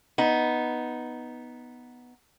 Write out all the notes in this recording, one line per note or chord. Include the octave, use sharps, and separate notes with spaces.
B3 D#4